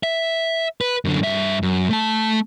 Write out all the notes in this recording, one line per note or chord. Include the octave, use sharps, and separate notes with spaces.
E5
B4
F#2 D3
G2 E5
F#2
A3 A5